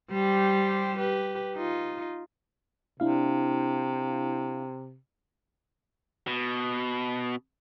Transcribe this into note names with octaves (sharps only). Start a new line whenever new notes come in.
G3 G4 C5
G4 B4
D#4 F4
C3 D4 E4 F5
B2